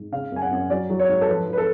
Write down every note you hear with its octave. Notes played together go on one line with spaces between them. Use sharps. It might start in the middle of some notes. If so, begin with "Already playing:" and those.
Already playing: G#2
C#3 F5
F#2 G#5
F#5
F#2
F#3 D5
F#3
C#5
G#2
A4
F3 B4
F3
B4
A4